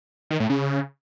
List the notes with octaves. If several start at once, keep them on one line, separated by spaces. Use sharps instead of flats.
D#3
A2
C#3